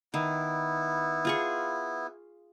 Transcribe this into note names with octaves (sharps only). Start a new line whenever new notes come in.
D#3 B3 E4
F4 G#4 C#6